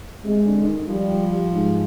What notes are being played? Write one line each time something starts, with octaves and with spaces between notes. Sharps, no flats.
C3 G#3
D3
D3
D#3
F3 G3
G#2